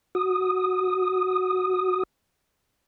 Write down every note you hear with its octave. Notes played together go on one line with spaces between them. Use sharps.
F#4 D#6